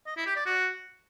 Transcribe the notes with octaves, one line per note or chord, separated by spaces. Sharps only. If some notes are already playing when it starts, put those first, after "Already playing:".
D#5
E4
G4
D5
F#4